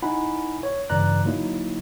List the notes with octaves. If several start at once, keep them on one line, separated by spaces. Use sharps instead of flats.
D#4 E4 F#5 G#5 B5
C#5
G2 C#3 E3 D5 A#5 F#6
D3 F#3 A#3 D#4 E4